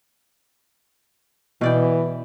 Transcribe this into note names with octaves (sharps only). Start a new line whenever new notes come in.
B2 E3 D5 G5